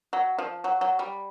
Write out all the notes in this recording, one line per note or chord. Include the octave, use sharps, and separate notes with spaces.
F#3
F3
F#3
F#3
G3